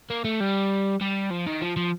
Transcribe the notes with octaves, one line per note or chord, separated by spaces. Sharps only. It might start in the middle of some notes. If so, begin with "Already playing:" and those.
A#3
A3
G3
G3
F3
D#3
F3
F3